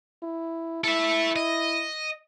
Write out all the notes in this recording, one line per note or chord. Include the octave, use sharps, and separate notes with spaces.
E4
E4 A4 E5
D#5